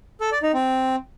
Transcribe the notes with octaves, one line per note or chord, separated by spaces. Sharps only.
A4
D5
D#4
C4